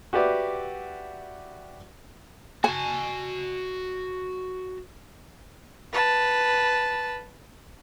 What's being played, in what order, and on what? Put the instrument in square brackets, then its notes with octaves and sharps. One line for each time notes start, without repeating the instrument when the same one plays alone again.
[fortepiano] F#4 G4 B4 D5 E5
[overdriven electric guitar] F#4 A5 [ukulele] G#5
[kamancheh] B4 A5